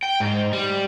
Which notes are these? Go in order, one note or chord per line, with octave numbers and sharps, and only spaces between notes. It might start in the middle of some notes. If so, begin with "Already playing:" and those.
G5
G#2
G3